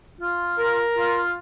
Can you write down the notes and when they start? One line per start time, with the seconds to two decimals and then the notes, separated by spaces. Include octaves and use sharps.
0.20 F4
0.58 A#4
0.97 F4